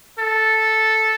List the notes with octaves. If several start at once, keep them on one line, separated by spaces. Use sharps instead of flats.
A4